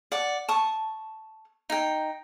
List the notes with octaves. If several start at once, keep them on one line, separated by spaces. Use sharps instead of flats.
D5 F#5 D6
A5 C#6 D#6
D#4 G5